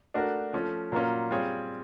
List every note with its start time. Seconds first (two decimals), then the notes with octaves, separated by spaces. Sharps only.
0.14 A3 D4 F#4 A#4
0.53 F3 A3 C#4
0.92 A#2 F#3 A#3 C#4
1.31 G3 C4 F4 G#4 C#5